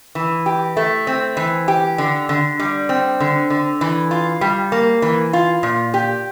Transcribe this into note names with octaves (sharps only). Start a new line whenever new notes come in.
E3
G4
A3
C4
E3
G4
D3
D3
G3
C4
D3
D3
E3
F4
G3
A#3
E3
F4
A#2
G4